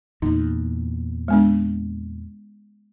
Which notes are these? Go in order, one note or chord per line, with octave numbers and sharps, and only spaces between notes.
E2 A#2 D#4
G#3 B3 D4